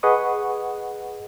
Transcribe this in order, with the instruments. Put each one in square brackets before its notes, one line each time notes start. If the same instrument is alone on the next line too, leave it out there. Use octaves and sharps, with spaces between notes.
[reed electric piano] G#4 B4 D#5 F#5 C#6 D#6